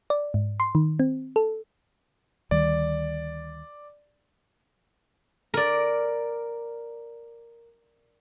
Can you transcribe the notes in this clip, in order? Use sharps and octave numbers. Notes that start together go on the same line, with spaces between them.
D5
G#2
C6
D#3
C4
A4
D2 D#3 G3 D5
A#4 D5